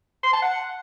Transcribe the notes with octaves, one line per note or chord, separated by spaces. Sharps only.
C6
A5
F#5